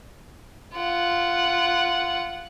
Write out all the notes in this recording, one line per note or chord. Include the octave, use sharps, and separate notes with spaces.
F4 F#5